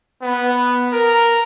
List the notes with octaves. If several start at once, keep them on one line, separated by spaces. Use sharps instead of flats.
B3
A#4